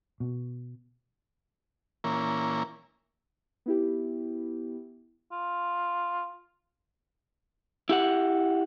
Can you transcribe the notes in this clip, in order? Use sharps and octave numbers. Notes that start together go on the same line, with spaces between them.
B2
A#2 E3 A#3 C#4
B3 E4 G4
F4
E4 G4 F#5